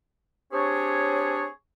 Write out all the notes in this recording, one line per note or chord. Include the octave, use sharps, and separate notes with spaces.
C4 D4 G4 G#4 C#5